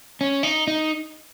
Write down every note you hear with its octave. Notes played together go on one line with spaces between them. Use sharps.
C#4
D#4
D#4